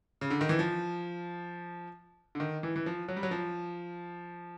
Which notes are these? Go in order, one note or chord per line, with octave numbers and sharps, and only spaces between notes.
C#3
D3
D#3
E3
F3
D3
D#3
E3
E3
F3
F#3
G3
F#3
F3